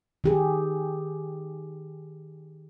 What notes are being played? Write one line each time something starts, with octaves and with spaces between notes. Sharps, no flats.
D#3 G4 G#4